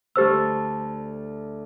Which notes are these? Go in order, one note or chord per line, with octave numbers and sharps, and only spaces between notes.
D2 G4 A4 C5 E6 F6